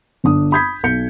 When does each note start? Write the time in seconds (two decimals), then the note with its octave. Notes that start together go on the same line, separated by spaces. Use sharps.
0.24 G1 D4 D#6
0.52 B5 D#6 G6 G#6 B6
0.83 B1 G6 C#7